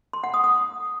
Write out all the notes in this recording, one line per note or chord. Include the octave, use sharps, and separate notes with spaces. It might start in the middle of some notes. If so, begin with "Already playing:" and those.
C6
F#5
D#6
D#6